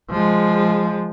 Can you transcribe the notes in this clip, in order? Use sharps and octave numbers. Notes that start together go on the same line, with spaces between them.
F3 G#3